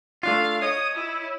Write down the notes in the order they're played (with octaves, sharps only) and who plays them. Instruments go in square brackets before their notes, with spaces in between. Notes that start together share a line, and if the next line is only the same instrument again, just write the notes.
[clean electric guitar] A3 D4 F4 [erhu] F5
[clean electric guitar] C#5 D#5 [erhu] D#6
[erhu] E4